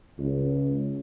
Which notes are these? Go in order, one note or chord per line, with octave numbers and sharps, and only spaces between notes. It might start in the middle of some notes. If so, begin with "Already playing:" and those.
C#2